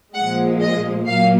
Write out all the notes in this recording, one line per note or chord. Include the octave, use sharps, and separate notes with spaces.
A#2 F3 G#3 F#5
D#5
A#2 F#3 A#3 F5